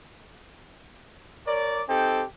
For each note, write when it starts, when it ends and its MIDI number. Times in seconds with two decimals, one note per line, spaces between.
1.47 1.83 70
1.47 1.83 73
1.47 1.83 74
1.89 2.24 60
1.89 2.24 63
1.89 2.24 67
1.89 2.24 69
1.89 2.24 79